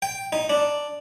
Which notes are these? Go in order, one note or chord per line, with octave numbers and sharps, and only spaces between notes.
G5
D#4
D4